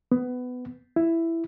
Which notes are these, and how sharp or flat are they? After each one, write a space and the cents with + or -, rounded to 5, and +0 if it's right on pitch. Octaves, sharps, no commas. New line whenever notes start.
B3 +15
E4 +10